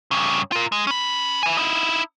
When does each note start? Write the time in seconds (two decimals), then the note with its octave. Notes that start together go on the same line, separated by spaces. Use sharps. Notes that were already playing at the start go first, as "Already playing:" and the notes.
0.11 G2 C#3
0.52 F4 A#4
0.72 G#3
0.87 C#4 B5
1.43 E4 G#5
1.57 D#4 E4